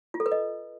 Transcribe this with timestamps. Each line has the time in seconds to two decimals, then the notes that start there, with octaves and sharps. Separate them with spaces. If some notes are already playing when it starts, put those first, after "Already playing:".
0.14 F4
0.20 A4
0.26 B4
0.32 D#5